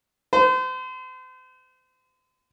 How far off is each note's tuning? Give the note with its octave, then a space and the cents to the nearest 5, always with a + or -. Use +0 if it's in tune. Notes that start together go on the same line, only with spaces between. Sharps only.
C5 -35